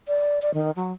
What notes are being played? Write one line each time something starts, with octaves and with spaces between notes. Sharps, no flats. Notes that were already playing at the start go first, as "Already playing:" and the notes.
D5
D5
D#3
F#3